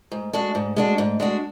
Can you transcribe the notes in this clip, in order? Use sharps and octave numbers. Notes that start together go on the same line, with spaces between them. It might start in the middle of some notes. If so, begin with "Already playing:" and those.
G#2
G#3 D4 F#4
G#2
G#3 D4 F#4
G#2
G#3 D4 F#4